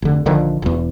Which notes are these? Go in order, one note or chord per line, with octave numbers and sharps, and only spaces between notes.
F1 D3
A#1 D3 D#3 F3
E1 E2